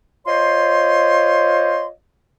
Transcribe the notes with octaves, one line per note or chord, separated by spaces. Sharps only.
F4 C5 C#5 D#5 C6